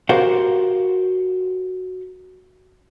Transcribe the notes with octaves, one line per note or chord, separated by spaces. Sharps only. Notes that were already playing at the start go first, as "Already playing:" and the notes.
F#4 G4 A#4 C5 F5 F#5